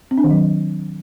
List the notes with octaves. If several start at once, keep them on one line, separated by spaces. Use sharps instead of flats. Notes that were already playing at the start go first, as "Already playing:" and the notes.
C4
D4
D#3
F#3